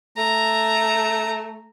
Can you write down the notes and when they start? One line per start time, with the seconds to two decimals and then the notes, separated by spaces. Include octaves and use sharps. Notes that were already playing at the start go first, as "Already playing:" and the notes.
0.17 A3 A#5